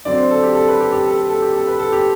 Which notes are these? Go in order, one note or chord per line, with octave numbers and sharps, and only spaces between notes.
D3 F#3 C4 D5
C5
A4
G4
A4
B4
G4
G4
A4
A4
A4
G4
A4
B4
A4
G4